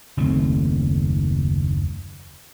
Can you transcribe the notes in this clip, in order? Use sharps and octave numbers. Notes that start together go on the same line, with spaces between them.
F#1 D#2 A3 C4